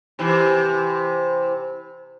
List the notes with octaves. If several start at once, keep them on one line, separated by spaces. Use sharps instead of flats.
C3 E3